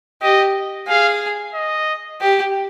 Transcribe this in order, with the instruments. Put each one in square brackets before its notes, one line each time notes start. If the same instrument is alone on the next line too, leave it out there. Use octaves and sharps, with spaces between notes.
[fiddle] G4 [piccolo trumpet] D#5
[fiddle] G#4 [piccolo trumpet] F5
[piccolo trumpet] D#5
[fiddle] G4